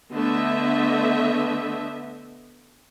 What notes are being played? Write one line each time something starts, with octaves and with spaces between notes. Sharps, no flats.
D3 A3 B3 D#5 E5